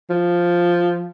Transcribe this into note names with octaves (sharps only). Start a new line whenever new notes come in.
F3